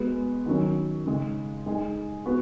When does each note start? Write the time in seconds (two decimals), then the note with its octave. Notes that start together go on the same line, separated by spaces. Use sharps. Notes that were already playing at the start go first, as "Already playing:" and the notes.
Already playing: G#3 B3 F#4
0.46 D#3 F#3 C#4
1.06 C#3 G#3 D#4
1.66 G#3 D#4 G#4
2.26 B3 F#4